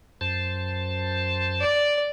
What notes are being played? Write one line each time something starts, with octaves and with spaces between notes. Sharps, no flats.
F#2 C5 A5
D5